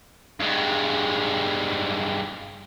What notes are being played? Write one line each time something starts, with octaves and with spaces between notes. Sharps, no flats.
G2 G#3